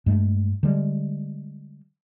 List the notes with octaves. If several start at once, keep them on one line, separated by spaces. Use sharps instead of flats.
G2 G#3 A3
D3 G3 G#3